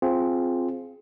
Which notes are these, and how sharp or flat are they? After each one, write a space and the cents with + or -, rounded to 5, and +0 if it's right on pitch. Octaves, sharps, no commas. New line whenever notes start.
C4 +0 F4 +0 G#4 +20